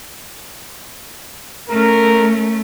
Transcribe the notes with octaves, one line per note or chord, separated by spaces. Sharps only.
A3 C#4 A#4